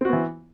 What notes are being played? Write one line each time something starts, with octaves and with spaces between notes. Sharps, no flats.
E3 B3 C4 F#4